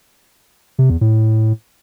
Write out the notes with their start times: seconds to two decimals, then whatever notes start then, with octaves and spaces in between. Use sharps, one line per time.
0.79 C3
0.90 E2
1.01 A2